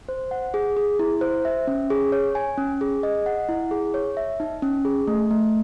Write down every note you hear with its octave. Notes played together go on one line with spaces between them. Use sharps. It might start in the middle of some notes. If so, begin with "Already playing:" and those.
C5
F#5
G#4
G#4
E4
C5
E5
C#4
G#4
C#5
G#5
C#4
G#4
D#5
F#5
E4
G#4
C#5
E5
D#4
C#4
G#4
A3
A3